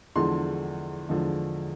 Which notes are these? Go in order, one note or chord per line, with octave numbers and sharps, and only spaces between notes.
E2 D3 F3 G#3 C6
E2 D3 F3 G#3